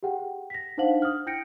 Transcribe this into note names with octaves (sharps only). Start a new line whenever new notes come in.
G4 G#4 F#5 G5
A#6 B6
D4 D#4 C5 F5 F#5 F#7
D#6 F6
E4 G5 G6 A#6 C#7 D7